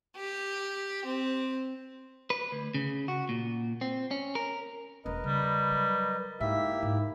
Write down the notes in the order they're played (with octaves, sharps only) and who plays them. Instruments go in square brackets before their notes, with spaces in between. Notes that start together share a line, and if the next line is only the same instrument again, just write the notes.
[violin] G4
C4
[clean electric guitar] B4
D2
C#3
F#4
A#2
C4
C#4
A#4
[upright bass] E1 C#4 [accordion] A#4 B4 D#5
[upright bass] C#3 [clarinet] G3
[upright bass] F#3
[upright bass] G#2 [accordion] A#3 E4 G4 [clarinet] E5
[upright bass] G#2